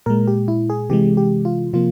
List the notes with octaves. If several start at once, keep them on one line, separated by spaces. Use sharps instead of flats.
A#2 G#3 A#4
G4
E4
G#4
C3 E3 G#3 G4
G4
F4
C3 F3 A#3 F4